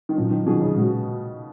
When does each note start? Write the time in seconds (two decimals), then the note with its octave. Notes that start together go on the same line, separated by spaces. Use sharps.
0.09 D#3
0.17 A#2 F3 F#3 C#4
0.31 D#3
0.46 B2 D#3 F#3 C#4 F4 G#4
0.61 C#3
0.76 A#2 G#3 C#4 F#4